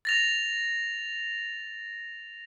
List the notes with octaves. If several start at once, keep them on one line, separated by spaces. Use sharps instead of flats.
A6 A#6 F7